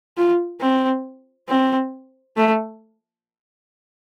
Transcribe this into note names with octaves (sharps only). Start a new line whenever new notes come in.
F4
C4
C4
A3